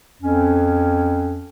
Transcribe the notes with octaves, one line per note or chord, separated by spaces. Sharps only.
F2 C#4